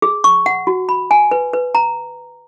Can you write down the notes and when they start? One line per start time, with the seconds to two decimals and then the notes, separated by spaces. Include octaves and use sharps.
0.02 G#4
0.24 C#6
0.46 F#5
0.67 F#4
0.89 B5
1.11 G#5
1.31 B4
1.53 B4
1.75 A#5